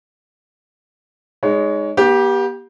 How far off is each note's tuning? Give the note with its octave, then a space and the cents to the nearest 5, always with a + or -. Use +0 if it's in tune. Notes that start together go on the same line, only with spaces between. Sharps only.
G#3 +0 D#4 +0 C#5 +25
B3 -45 G4 +0